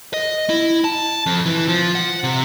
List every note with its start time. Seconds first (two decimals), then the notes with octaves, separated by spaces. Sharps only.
0.14 D#5
0.50 E4
0.84 A5
1.26 F2
1.46 E3
1.68 F3
1.95 F#5
2.23 C3